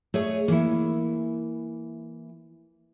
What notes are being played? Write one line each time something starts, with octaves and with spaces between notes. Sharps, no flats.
A3 G#4 C#5 D#5
E3 A#3 E4